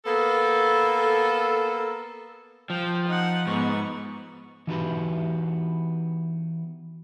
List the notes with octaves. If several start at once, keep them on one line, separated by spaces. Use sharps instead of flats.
A#3 B3 A4
F3 G5
D#4 F#5
G#2 B3 C#6
E3 B3 D#4 F#4 G4 B4